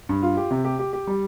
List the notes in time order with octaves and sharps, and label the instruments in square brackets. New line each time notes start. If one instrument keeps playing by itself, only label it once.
[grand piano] G2
F4
G4
C3
G4
G4
G4
G3